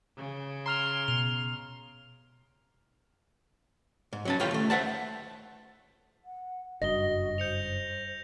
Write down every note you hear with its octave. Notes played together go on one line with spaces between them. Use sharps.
C#3
A#5 C6 F6 F7
B2 F7
G#2
F#3 C#4 A5
D#2 A2 A3 F4 C#5 G5
D#2 A3
C5 E5 F#5 A5
F#5
F#1 G2 F#4 D#5 A#6 G7
C5 G6 C#7 F7